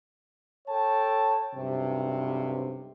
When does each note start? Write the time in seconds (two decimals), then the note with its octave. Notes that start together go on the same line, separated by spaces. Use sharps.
0.68 A4 C#5 G5 A5
1.55 B1 G2 C3